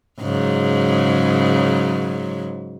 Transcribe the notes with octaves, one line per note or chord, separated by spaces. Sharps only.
G#2 C#3 F#3